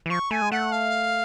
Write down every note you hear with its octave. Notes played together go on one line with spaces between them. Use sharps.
E3
F3 C#6
A3 G#5
G#3
A3 F#5
F5